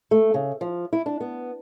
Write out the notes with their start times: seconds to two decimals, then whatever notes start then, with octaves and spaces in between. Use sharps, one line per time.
0.11 A3
0.34 C#3
0.61 F3
0.93 E4
1.06 D4
1.20 B3